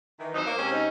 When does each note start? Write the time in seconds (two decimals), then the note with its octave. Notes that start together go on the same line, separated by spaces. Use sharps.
0.19 D#3 E3
0.33 F2 F#3 D#4 C5
0.46 A#3
0.57 C3 G#3 C#4
0.72 D#4